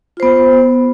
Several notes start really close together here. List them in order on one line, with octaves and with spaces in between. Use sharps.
F4 C5 B3